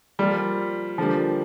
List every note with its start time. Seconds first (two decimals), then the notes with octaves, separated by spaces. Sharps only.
0.19 F3 G3 A#3 F4
0.98 D3 F3 G3 A#3 D4 G4